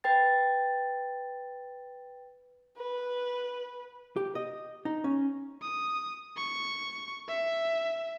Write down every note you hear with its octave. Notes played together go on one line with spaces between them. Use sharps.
B4 G5 A6
B4
G4
D#5
D#4
C#4
D#6
C#6
E5